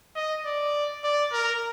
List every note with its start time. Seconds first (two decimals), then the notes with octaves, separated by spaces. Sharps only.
0.16 D#5
0.45 D5
1.04 D5
1.32 A#4